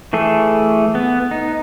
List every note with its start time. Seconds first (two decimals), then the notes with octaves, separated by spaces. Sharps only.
0.13 E3 A3 G#4 A4
0.95 B3
1.31 D#4